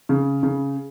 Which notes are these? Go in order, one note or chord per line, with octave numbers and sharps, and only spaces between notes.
C#3
C#3